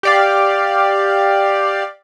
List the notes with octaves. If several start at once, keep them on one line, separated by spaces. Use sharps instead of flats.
G4 D5 F5